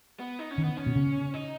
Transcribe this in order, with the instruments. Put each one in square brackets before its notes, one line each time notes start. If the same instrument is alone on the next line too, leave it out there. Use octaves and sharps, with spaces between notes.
[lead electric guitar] B3
D#4
C#4
[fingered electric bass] D#3
[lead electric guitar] B3
C#4
[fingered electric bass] B2
C#3
[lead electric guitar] D#4